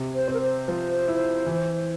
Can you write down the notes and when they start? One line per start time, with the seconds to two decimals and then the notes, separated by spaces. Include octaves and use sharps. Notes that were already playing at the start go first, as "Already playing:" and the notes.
Already playing: C3
0.15 C5
0.28 C4
0.34 A#4
0.41 C5
0.68 F3
1.08 E4
1.46 E3